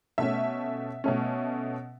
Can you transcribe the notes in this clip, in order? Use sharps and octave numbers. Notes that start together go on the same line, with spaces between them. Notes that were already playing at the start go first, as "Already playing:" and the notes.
B2 A3 C#4 E5
B2 A3 C#4